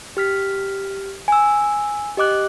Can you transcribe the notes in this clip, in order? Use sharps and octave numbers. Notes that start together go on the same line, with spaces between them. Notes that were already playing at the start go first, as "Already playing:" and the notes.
G4 F6 B6
G#5 E6
G4 D#5 D6 F#6